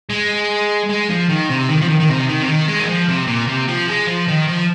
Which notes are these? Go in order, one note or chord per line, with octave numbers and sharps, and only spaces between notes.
G#3
G#3
F3
D#3
C3
D#3
F3
D#3
D#3
C3
D#3
C3
D#3
G#3
D#3
F3
C3
A#2
C3
F3
G#3
F3
D#3
F3